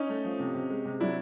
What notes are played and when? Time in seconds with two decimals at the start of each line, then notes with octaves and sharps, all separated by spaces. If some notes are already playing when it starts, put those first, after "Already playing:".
Already playing: C#4 D#4
0.09 A3
0.25 F3
0.40 C3
0.55 C3
0.70 G#3
0.85 C3
1.00 F#3 D4 E4